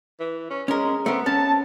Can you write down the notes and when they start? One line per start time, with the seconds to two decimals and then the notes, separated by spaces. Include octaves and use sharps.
0.20 E3
0.51 C#4
0.68 G#3 C#4 A#4
1.06 A3 B3 C4 A#4
1.26 C#4 A5